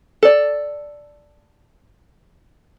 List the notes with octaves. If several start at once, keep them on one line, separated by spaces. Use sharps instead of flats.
A4 D5